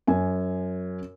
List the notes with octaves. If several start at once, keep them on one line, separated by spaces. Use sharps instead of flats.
F#2 G#5